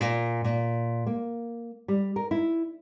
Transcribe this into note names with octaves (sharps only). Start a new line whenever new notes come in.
A#2
A#2
A#3
G3
A#4
E4